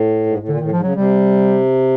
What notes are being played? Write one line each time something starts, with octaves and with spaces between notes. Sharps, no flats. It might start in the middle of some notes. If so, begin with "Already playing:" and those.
Already playing: A2
G#2
A2
A#2 D3
A2 D#3
G#2 F3
C#3 F#3
C3 G3